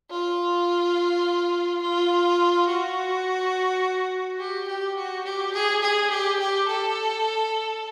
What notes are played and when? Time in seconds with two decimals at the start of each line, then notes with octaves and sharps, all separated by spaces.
0.10 F4
1.82 F4
2.68 F#4
4.39 G4
4.68 G4
4.96 F#4
5.25 G4
5.53 G#4
5.82 G#4
6.10 G4
6.39 G4
6.68 A4